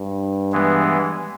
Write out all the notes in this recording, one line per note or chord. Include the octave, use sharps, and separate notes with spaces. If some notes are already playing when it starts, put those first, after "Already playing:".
Already playing: G2
E3 G#3 B3